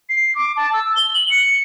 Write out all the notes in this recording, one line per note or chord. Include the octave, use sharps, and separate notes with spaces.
C7
D6
A5
E6
G7
F#7
C#7